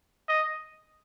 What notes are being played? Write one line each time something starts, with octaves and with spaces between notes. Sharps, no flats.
D#5